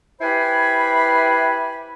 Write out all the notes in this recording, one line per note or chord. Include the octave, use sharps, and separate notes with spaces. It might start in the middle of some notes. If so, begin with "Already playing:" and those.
E4 G4 B4 C5 G#5 B5